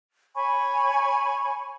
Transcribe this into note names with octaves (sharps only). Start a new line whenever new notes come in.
C#5 G#5 B5 C#6